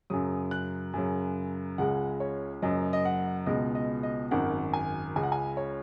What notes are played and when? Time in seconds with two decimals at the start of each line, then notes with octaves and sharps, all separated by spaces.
0.10 F#2 C#3 F#3 D#6
0.51 F#6
0.94 F#2 C#3 F#3
1.78 C#2 C#3 G#3 F#5
2.20 C#5
2.62 F#1 F#2 F#3 D#5
2.93 D#5
3.05 F#5
3.46 C#2 B2 G#3 D#5
3.75 D#5
4.03 D#5
4.31 G#1 F#2 D#3 F#5
4.73 G#5
5.16 C#2 C#3 G#3 G#5
5.23 F#5
5.32 G#5
5.57 C#5